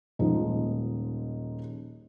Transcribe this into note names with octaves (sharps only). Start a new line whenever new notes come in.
D#1 F3 G#3 D#4